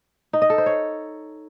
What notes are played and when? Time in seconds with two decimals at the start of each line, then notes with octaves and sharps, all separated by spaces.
0.33 D#4
0.42 D#5
0.50 A4
0.58 C5
0.66 C#5